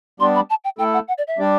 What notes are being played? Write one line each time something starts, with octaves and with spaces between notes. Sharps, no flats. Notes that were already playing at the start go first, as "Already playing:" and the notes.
G3 B3 D4 G4 D5 C6
B5
A5
G5
A3 E4 A4 G5
F#5
F#5
D5
E5
G3 D4 G4 D5